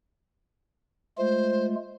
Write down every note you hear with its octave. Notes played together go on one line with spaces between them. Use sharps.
G#3 A3 F4 C5